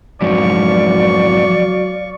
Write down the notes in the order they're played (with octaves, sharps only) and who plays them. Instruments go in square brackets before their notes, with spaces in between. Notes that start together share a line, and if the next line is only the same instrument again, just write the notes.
[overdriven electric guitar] F2 G#2 [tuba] F#3 [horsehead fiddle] D5 [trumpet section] F5 C#6